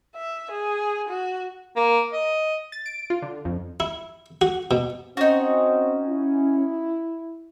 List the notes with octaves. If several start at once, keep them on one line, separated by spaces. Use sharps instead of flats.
E5
G#4
F#4
A#3
D#5
A6
D7
F4
D3
F2
E4
F#4
B2
C4 C#4 D#4 F#4
E4